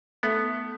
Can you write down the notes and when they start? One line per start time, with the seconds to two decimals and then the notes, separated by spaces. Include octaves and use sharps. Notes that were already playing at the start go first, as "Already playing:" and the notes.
0.23 A3 B3